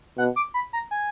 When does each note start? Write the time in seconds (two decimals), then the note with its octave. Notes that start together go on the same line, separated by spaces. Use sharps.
0.18 B2 F#5
0.36 D6
0.54 B5
0.73 A#5
0.91 G#5